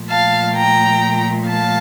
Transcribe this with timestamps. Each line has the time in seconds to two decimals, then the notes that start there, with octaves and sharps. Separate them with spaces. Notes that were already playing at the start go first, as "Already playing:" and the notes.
Already playing: A#2 F3 A3
0.09 F5 A5
0.55 G5 A#5
1.48 F5 A5